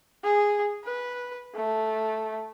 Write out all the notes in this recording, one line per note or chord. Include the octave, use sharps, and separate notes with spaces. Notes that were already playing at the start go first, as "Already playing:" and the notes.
G#4
B4
A3